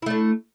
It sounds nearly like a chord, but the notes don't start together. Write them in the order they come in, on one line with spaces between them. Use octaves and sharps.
E4 A3 D4